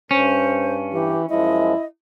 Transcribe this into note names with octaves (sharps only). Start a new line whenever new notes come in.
G2 C#4 C5
E3 G4
F#2 F3 G#3 E4 D#5